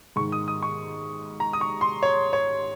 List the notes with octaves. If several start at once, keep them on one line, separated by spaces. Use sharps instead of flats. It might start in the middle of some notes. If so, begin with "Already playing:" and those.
G#2 D#3 C#6
D#6
D#6
C#6
A#5
D#6
C#6
C6
C#5
C#5